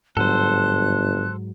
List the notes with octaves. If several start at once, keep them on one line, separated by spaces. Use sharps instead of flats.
G1 G#2 F#3 A4 C5 F#6